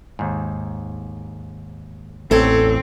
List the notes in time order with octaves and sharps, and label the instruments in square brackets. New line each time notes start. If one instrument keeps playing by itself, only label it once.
[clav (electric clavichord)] D#2 G#2
[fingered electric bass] A1 [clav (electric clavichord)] E2 A2 [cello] C4 [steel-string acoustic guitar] A4 C#5